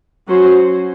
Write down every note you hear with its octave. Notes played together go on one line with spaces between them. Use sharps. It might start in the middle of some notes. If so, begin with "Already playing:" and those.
F#3 C#4 F#4 C5